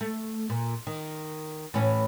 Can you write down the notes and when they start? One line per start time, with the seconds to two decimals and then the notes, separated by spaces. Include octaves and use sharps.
0.01 A3
0.50 A#2
0.87 D#3
1.74 A2 E3 C#4